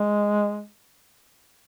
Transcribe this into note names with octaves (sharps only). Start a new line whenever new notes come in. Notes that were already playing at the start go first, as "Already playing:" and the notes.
Already playing: G#3